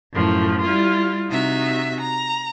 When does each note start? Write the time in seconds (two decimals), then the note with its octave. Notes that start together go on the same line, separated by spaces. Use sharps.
0.12 F#2 A2 F3
0.63 G3 E4 F4
1.30 C3 D#4 F#4 E5
2.01 A#5